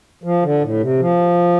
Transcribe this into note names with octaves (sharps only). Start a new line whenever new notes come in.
F3
D3
A2
C3
F3